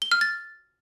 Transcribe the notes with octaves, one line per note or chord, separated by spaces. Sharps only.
G7
F6
A6